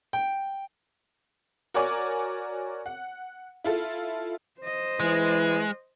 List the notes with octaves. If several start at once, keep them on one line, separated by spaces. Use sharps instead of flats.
G5
F#4 A#4 C#5 D5 G#5 D6
F#5
E4 F4 A4
C5 D#5
E3 G#3